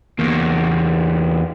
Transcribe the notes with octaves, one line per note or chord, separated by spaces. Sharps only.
E2 A#3